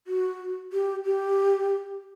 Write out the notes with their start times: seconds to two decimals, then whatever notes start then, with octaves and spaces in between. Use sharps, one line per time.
0.07 F#4
0.73 G4
1.04 G4